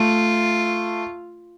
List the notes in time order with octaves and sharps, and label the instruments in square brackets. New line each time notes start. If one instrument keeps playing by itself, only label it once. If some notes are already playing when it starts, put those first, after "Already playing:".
Already playing: [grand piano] A3 [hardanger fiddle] F4